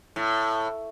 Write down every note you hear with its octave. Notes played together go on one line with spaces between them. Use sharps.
A2